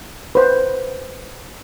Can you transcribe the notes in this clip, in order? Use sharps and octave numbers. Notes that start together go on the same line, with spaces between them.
B4 C5